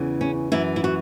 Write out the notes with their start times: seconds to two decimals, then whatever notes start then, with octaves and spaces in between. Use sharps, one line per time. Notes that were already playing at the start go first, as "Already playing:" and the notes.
Already playing: E2 C#3 E3
0.21 C#4
0.52 F#2 E3 E4
0.76 E4
0.84 F#4